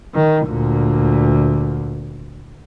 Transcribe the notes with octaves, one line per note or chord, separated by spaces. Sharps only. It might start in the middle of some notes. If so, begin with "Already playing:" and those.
D#3
D2 A#2